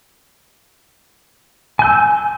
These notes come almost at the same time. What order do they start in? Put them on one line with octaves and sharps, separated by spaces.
G#5 G6 E6